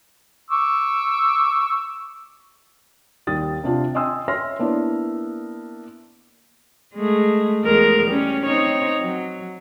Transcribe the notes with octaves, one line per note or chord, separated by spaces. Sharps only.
C#6 D6 E6
D#2 G3 D#6 A6
C3 C4 D4 F4
D#5 G5 G#5 C6 D#6 E6
C#5 E5 C6 F6 A#6
A#3 B3 D4 E4 D5
G#3 A3
E2 G#3 A#4
G3 C#4
C4 D#4 C#5
F#3